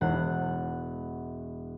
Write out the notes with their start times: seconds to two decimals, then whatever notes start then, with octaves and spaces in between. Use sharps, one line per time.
0.01 E1 F#5